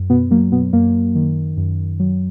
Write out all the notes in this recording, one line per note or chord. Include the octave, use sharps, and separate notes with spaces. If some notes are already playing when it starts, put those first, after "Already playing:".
Already playing: F#2
B2 B3
F#3 A#3
B2 B3
F#2 A#3
D#3
F#2
F#3